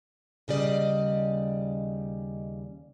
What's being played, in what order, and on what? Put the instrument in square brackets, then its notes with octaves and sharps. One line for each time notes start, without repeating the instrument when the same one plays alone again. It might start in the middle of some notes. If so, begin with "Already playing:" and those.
[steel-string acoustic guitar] D#2 C#3 G3 D5 D#5